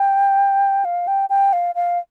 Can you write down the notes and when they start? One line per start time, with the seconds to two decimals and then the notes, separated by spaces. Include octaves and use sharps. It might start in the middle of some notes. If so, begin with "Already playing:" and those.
Already playing: G5
0.85 F5
1.07 G5
1.30 G5
1.53 F5
1.75 F5